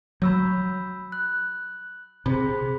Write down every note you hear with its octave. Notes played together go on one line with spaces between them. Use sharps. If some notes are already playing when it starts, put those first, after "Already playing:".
F#3 B5 E6 G6
F#6
C3 G#4 C5 B5